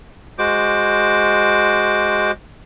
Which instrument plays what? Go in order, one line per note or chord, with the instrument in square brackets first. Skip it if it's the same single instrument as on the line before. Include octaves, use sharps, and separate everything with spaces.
[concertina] G#3 F#4 C5 D6